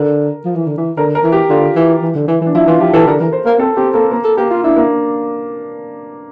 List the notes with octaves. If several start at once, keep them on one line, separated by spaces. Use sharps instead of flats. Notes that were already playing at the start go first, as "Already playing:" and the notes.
Already playing: D3 A#4
F3
E3
D3
E3
D3 A#4
A#4
E3
G4
D3 F4
E3
E3
D3
E3
E3 D4
F3 E4
E3 F4
F3 G4
E3 A4
D3 A#4
E3 A#4
C5
A#3 A#4
C4 A4
C4 G4
A#3 A4
A#3
A4
A#3 G4
F4
D4 E4
A#3